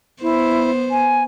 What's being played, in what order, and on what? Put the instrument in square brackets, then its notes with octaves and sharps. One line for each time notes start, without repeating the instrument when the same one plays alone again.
[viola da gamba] B3 C5 [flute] E4
[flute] G#5